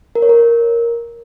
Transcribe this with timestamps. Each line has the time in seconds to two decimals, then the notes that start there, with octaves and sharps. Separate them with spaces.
0.15 A#4
0.22 C#5
0.29 A#4